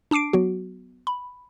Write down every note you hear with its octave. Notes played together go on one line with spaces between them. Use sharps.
D4 A5 D6 C7 D7
F#3 B3 F#4
B5